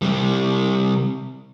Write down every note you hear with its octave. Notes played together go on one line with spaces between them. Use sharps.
C3 G3